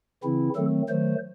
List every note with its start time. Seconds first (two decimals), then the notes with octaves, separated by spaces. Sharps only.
0.23 C#3 E3 C4 E4
0.56 D#3 F#3 A3 C4 A4
0.89 D#3 F#3 A3 C5